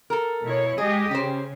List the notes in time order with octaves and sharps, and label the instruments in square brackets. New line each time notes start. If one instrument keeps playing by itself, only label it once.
[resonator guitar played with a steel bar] A4 A#4
[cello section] B2 E4 C#5
[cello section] G#3 G4 D#5 [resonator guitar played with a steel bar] G#4
[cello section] C#3 [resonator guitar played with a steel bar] G4 C5